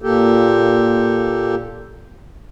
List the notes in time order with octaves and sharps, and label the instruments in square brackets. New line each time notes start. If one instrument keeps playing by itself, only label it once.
[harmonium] A#2 A#3 G4 A4